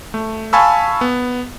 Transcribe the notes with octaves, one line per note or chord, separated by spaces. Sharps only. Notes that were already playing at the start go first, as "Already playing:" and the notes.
A3
F5 G#5 A5 B5 C#6 E6
B3